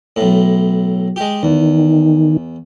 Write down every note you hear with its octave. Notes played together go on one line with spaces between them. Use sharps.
B1 A2
G#3 G4
E2 D#3